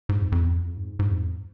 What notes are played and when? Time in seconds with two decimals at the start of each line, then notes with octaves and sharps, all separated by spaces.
0.09 G#2
0.21 F2
0.32 F2
0.43 E2
0.55 F2
0.77 G#2
0.99 G#2
1.10 F2
1.21 E2